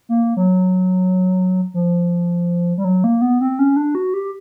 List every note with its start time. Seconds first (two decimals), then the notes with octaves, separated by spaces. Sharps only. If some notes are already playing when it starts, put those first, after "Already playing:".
0.09 A#3
0.37 F#3
1.74 F3
2.78 G3
2.84 F#3
3.04 A#3
3.22 B3
3.41 C4
3.59 C#4
3.76 D4
3.95 F#4
4.14 G4